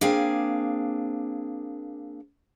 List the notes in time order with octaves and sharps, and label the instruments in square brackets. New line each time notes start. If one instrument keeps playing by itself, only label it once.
[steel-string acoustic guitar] A#3 C4 D4 G#4 F5